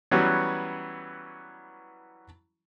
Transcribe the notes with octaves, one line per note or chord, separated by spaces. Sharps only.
E3 F#3 G3 B3 C#4 F#4